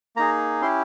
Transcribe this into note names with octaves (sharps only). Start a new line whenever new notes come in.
A#3 D#4 G#4 A#5
C#4 E4 G4 C6